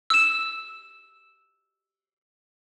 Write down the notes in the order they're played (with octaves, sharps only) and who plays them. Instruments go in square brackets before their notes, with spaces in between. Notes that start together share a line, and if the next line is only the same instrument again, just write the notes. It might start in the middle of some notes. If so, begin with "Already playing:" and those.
[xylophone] E6 E7